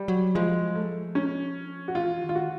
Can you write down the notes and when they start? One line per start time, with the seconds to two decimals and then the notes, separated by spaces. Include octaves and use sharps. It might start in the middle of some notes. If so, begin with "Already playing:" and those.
Already playing: G3
0.08 F#3
0.35 F3 G#3
0.75 A3
1.15 C#4
1.88 F#4
1.95 E3 F4
2.22 D#3
2.29 F4
2.35 F#4